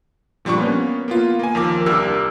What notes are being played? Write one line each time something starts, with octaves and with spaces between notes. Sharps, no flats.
A#2 F3 G3 D4 C#6
A#3 B3 C#4
A#3 B3 F4
A#3 G#5
D#2 F3 A#4 D6
C2 D4 G4 A#4 E6